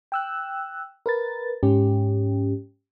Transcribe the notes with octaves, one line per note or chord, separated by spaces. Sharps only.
G5 E6 F#6
A#4 B4 A6
G#2 C#4 G4